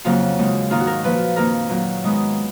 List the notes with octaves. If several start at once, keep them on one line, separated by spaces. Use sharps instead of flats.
F2 C#3 F#3 A#3 F4
D#2 C#3 G#3
G#2 D#3 A#3 F4
F#4
A#4
A#2 F3 A#3 B4
F2 D#3 A#3 A#4
A#2 F#3 A#3
G#2 D#3 G#3 B3